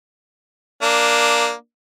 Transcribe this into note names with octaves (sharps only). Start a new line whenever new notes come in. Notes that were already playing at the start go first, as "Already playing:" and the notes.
A#3 D4